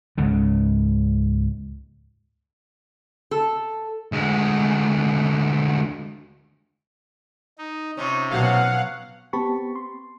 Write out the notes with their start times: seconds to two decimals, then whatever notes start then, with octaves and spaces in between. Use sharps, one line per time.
0.18 C#2 G#2 C#3
3.31 A4
4.12 D2 G#3
7.58 D#4
7.97 C3 C#4 D#4 F4
8.30 B2 F#3 F5 F#5
9.33 B3 C4 G4 A5 B5 C#6
9.76 C6